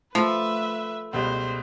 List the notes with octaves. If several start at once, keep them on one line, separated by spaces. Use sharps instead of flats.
F3 A3 B4 E5
C#2 B2 G3 C5